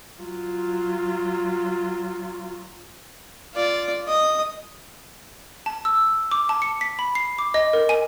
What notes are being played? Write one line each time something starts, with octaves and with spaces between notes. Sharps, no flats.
F#3 F4
F4 D5
D#5 D#6
A5
E6
D6
A5
C#7
B6
B5
C7
D6
D#5
A#4
G#5